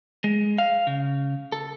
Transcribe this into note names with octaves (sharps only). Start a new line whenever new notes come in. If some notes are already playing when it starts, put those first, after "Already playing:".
G#3
F5
C#3
A4